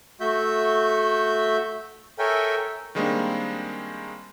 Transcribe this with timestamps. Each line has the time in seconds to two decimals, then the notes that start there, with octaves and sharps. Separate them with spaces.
0.20 A3 F#4 E5 G6
2.19 A4 A#4 C#5 E5 G5 G#5
2.95 D#3 G3 G#3 A#3 C4 D4